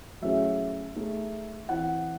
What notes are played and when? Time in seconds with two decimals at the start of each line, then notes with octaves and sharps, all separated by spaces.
0.22 F#3 A3 C#4 E4 G#4 E5
0.96 A3 D#4 G#4
1.69 E3 C4 E4 F#5